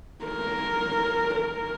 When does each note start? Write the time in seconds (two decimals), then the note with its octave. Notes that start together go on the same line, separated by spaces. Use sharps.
0.25 A#4
1.34 A#4